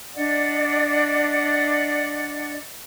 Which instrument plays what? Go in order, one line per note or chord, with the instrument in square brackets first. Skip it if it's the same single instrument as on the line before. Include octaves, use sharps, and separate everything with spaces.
[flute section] D4 D5 D#5 F#5